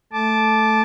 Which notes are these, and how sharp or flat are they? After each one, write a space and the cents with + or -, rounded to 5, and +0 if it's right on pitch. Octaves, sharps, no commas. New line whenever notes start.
A3 +0 A5 -15 D6 +5